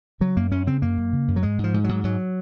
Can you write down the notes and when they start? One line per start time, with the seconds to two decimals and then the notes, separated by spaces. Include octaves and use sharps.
0.20 C#3 F#3
0.37 F#2 A#3
0.51 F#2 C#4
0.67 C#3 C4
0.82 F#2 A#3
0.98 F#2
1.13 C#3
1.28 F#2
1.36 F#3
1.43 G#2 G#3
1.58 G#2
1.64 F3
1.74 G#2
1.84 G#2 F#3
2.04 G#2 F#3